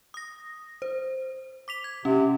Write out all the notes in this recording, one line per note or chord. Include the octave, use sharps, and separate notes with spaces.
D#6 A#6
C5
D6 B6 F7
G#6
C3 C#4